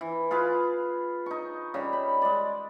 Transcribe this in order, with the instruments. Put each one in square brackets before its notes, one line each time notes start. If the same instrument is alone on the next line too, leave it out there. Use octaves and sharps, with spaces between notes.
[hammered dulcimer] E3
F4 G#4 B4 F5
D#4 C#6
C#3 G3
B5
G#3 D5